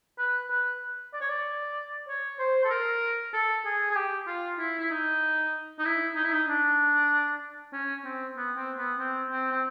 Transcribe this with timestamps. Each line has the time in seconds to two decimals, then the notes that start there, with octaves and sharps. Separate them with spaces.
0.18 B4
0.50 B4
1.13 D5
1.21 C#5
1.29 D5
2.08 C#5
2.39 C5
2.65 A4
2.70 A#4
3.34 A4
3.65 G#4
3.90 G#4
3.96 G4
4.27 F4
4.59 E4
4.79 E4
4.91 D#4
5.79 D#4
5.85 E4
6.16 D#4
6.24 E4
6.32 D#4
6.48 D4
7.73 C#4
8.05 C4
8.37 B3
8.57 C4
8.78 B3
8.99 C4
9.31 C4
9.51 C4